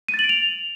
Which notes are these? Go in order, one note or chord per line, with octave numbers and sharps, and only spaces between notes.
D#7
A6
F#7
D7
F7